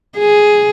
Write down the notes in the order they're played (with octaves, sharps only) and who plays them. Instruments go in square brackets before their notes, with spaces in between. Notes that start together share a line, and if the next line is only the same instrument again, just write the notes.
[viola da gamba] G#4